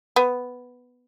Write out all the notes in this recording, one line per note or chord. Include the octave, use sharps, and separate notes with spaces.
B3